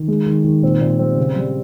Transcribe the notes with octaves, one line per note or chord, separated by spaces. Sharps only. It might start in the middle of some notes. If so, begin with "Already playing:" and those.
Already playing: D#3
G#3
D#3
D#3
A#2 C4
A#2
G3 C4
C#3
G3